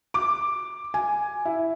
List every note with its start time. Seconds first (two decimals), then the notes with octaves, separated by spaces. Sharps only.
0.14 D6
0.94 G#5
1.45 E4